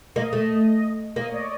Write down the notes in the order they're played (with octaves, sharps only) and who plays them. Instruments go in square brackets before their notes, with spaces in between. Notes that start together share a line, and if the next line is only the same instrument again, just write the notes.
[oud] A#3 [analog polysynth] D#5
[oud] A3
[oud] A#3 [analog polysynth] D#5
[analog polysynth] C#5
D5